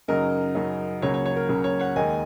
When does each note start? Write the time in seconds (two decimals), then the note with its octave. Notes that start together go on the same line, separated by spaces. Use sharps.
0.08 F#2 C#3 F#3 D#4 A#4 D#5
0.55 F#2 C#3 F#3 D#4
1.01 C#2 C#3 F#3 A#3 C#5
1.14 C#5
1.26 C#5
1.36 A#4
1.48 C#2 C#3 F#3 A#3
1.64 C#5
1.79 C#5 F#5
1.96 D#2 D#3 G#3 D#4 D#5 G#5